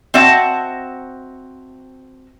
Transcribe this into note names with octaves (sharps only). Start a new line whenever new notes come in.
C4 F#4 D#5 E5 F#5 A5